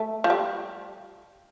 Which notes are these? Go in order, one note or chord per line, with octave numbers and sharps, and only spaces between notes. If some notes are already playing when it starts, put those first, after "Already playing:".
Already playing: A3
F3
G3